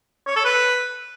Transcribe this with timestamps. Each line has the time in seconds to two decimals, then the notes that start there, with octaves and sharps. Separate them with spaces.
0.27 C#5
0.36 A4
0.45 B4